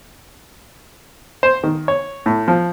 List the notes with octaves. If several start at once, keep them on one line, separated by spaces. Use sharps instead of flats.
C5
D#3
C#5
A2
F3